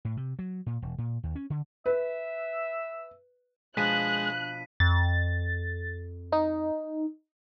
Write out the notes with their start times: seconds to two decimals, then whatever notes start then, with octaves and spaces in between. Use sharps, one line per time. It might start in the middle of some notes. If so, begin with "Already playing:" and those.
0.05 A2
0.17 C3
0.39 F#3
0.66 A#2
0.82 E1
0.98 A#2
1.23 D#2
1.36 C#4
1.50 D3
1.86 B4 E5
3.77 B2 F3 G#3 D4 G#4 F#6 B6 D#7
4.80 F2 A6
6.32 D#4